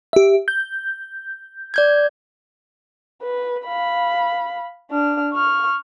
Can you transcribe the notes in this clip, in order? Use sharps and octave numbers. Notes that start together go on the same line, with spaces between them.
G4 E5
G6
D5 G6 G#6
B4
F5 B5
D4 F6
C#6 F6